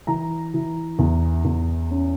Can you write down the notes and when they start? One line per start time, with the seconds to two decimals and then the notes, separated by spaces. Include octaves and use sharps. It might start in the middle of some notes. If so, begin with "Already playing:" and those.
0.07 E3 A#5
0.54 E3
0.99 E2
1.45 E2
1.91 C#4